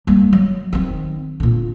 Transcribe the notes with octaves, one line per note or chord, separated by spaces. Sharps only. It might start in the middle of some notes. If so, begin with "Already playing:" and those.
G3 A#3
F#3
D#3 C4
A#2 D3